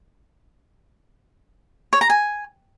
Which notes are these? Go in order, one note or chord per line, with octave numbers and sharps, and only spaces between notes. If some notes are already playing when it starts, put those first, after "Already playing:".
C#5
A#5
G#5